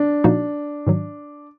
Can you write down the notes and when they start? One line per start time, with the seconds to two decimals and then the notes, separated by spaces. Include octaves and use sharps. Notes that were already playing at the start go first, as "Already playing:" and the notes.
Already playing: D4
0.24 A#2 F3 A#3 D#4 F#4
0.87 G#2 D#3 F#3